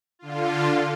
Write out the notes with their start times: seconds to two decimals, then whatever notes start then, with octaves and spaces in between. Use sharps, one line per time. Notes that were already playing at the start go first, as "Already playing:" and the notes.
0.19 D3 F4